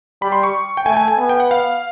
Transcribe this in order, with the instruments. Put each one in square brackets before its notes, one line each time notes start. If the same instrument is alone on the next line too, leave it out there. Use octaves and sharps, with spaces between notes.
[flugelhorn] G3 [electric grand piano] B5
[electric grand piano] C6
C#6
G5
[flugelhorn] A3 [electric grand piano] G#5
[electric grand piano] G5
G#5
G#5
[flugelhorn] B3 [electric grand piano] G#5
[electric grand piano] G5
F#5
F5